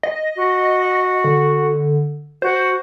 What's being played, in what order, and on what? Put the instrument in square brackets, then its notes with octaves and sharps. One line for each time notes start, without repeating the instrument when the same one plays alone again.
[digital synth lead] D#5
[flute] F#4
[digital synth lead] D3
[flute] F#4 [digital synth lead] C5